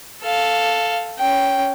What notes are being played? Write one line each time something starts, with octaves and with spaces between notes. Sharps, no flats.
A4 F5
C#4 G5